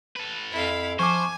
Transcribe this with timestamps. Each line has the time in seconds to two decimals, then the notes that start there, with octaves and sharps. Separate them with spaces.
0.16 A4 B4
0.52 F2 E4 F5
0.99 F3 C5 G#5 C#6 D6